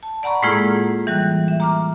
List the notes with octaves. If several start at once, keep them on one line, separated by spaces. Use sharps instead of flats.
A5
D5 F#5 A#5 B5 C#6
A2 G#3 A#3 E4 F4 G#4
E3 G3 F#6
E5
A#5 D6 F6